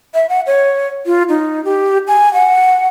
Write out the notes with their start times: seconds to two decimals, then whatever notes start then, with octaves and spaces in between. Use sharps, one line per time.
0.14 E5
0.29 F#5
0.47 C#5
1.06 F4
1.29 D#4
1.65 G4
2.08 G#5
2.34 F#5